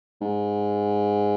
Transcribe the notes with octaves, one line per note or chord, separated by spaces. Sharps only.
G#2